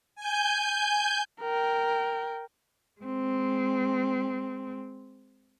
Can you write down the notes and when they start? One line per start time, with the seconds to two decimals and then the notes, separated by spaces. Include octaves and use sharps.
0.15 G#5 G6
1.41 A#4 G5
3.01 G#3 C4